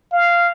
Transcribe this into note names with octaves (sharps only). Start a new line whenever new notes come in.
F5